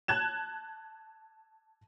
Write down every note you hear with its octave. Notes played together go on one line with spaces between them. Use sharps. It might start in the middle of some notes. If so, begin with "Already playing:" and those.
A5 F#6 G#6 E7